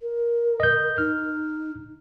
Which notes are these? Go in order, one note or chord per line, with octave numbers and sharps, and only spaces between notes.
A#4
D#5 G6
D#4 F6